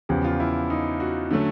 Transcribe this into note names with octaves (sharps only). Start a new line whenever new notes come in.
E2 C#3 F3 G4
F4
E4
D#4
F#4
D3 F#3 A3 C#4